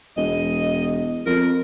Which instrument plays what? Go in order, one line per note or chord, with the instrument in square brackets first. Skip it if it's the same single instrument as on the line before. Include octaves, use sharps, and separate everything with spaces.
[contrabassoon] E1 [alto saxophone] D#5
[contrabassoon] F2 [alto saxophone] A#4